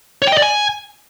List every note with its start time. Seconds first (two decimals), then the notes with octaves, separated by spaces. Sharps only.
0.22 C#5
0.27 G5
0.32 D#5
0.37 D5
0.42 G#5